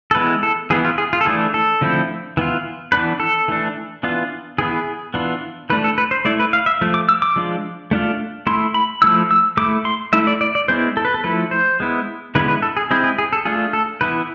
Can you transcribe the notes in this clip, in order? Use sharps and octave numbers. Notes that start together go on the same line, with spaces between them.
A4
E3 G#3 B3 E4 B4
A4
E3 B3 E4 G#4
F4
G#4
F4
A4
E3 A3 D4 G#4
A4
D3 F3 A3 C4 E4
E3 B3 F4
E3 B3 D4 B4
A4
E3 A3 D4
E3 B3 D4 F4
E3 B3 E4 G#4
E3 B3 D4 F4
E3 A3 D4 B4
A4
B4
C5
A3 E4 D5
B4
F5
E5
F3 A3
D6
E6
D6
F3 G#3 D4 F4
A3 D4 F4
A3 E4 C6
B5
F3 A3 E4 E6
E6
A3 E4 D6
C6
A3 E4 E5
D5
D5
D5
G#3 B3 E4 C5
A4
B4
A4
F3 A3 E4 B4
C5
G#3 B3 E4
D3 G#3 B3 E4 B4
B4
A4
G#4
G#3 C4 E4 G#4
G#4
G#4
A4
A3 D4 F4 G#4
A4
E3 B3 E4 B4